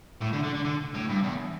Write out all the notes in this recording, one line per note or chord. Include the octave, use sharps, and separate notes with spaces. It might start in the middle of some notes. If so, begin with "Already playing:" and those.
A2
D3
D3
D3
D3
A2
G2
E2